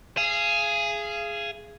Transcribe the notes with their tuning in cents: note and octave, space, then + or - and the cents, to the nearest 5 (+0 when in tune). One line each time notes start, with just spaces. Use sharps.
G#4 +5 F5 -35